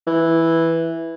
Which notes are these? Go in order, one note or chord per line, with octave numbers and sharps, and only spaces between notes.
E3